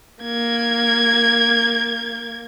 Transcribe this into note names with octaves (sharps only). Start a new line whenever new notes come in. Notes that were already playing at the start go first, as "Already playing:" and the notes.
A#3 G#6